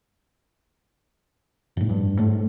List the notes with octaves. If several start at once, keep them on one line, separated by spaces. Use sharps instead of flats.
F2 A2
G2
G#2 A3